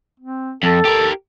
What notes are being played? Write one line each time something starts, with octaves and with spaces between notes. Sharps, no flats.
C4
F2 A4
G4 A#4